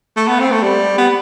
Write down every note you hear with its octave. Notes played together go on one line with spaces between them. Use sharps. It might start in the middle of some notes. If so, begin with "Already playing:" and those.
A3
B3
C4
A3
G3
B3